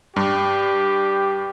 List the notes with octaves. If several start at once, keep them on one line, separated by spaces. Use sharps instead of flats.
G2 G4